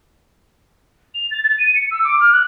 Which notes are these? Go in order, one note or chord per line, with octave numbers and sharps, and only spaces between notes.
F7
A6
A6
D#7
C#7
E6
D6
F6
F#6